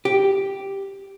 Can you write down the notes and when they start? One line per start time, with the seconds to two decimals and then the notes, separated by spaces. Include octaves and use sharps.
0.05 G4